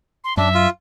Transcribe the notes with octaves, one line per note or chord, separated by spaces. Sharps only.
C6
F#2 F#3 D4 E5
F4